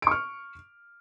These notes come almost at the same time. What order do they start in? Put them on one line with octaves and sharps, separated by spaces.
D7 C#6 F6